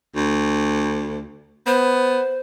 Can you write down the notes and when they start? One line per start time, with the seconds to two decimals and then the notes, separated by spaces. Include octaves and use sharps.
0.16 D2
1.67 B3 C5